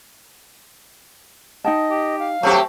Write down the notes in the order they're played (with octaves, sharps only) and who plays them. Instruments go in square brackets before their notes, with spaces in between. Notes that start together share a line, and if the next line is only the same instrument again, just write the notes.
[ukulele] D#4 G5 A5 [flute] D#5
[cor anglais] G4
[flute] F5
[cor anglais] F#3 [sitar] A3 C4 G4